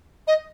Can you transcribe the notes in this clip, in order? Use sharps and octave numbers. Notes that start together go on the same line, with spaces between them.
D#5